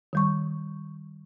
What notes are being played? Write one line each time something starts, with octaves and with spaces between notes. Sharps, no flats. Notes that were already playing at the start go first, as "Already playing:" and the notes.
D#3 G3 C#6